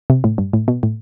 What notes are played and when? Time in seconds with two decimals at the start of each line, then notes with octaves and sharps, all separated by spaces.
0.10 C3
0.24 A2
0.38 G2
0.53 A2
0.68 B2
0.83 A2